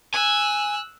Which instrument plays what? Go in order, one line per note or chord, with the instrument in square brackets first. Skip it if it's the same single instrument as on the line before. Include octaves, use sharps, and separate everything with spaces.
[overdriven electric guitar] G#5 [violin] E6 F#6